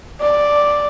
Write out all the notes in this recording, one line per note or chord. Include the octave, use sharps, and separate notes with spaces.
D5